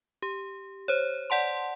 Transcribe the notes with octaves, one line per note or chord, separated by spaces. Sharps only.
G4
C5 C#5
D5 F#5 A5 C6